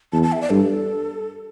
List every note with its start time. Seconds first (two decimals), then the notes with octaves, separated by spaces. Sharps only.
0.13 E2 A5
0.23 A5
0.32 E5
0.41 D5
0.51 G2 A4